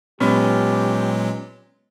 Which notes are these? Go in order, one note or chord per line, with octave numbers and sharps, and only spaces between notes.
A#2 F#3 G#3 B3 C#4 G4